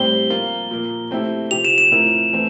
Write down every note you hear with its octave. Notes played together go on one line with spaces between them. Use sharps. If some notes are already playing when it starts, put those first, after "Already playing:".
Already playing: A2 G3 C4 G4 C5 G7
F3 A#3 F4
A#2 F3 A#3
A3 C4 E4 G4
C3 F3 C4 G4 F7
E7
E7
A2 F3 C4 E4 A#4
E3 A3 C4